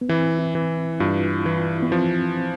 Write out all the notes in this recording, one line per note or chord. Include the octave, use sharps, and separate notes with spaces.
B3
E3 C4
E4
E3
G2 F4
E3 E4
B3
F3 C4